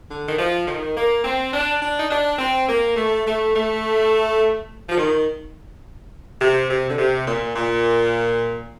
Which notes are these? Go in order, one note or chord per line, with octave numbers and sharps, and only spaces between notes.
D3
D#3
F3
D#3
A#3
C4
D4
D4
D#4
D4
C4
A#3
A3
A3
A3
F3
D#3
C3
C3
D3
C3
A#2
A#2